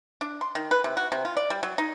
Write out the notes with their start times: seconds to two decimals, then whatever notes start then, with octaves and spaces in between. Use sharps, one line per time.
0.21 D4
0.41 C6
0.55 D#3
0.71 B4
0.84 C3
0.97 F#4
1.12 C3
1.25 F4
1.37 D5
1.50 G3
1.63 F#3
1.78 D#4